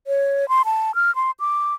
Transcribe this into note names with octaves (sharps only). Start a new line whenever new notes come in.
C#5
C6
A5
F6
C6
D6